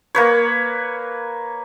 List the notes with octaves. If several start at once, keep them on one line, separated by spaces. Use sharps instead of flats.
A#3 B4 C#5